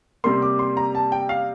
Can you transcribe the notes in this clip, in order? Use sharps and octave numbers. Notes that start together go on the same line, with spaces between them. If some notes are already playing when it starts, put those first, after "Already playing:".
C3 G3 A#3 C6
D6
C6
A#5
A5
G5
F5